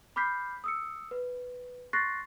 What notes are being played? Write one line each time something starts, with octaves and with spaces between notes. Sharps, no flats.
B5 D6 F6 G6 B6 C7
D#6 E6 C#7
B4
C6 C#6 F#6 A6 A#6 C7